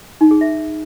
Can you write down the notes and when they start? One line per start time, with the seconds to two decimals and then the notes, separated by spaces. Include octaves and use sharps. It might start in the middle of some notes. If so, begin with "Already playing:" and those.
0.21 D#4
0.31 G#4
0.41 E5